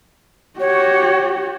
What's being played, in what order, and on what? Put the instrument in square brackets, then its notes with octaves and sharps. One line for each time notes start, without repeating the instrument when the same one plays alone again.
[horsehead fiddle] F#4 G4 [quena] C#5